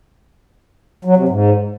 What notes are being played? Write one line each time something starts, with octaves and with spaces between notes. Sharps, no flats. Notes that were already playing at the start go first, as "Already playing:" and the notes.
F#3
C3
G#2